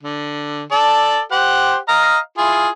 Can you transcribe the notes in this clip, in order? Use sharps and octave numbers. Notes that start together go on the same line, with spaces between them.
D3
A4 D5
G4 C5 F#5
D#5 F5 A#5
E4 F4 G#4